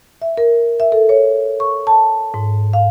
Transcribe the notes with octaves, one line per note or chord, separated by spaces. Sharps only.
E5
A#4
E5
A4
C#5
C#6
A5
G#2
F5